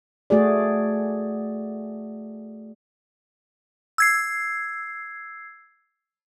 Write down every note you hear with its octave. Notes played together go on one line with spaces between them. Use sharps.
A3 F#4 G#4 D5
E6 G#6 C7